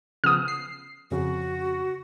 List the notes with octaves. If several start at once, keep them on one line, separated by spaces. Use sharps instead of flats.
C#3 F3 B3 D#6 F6
C7
F2 C#3 F#4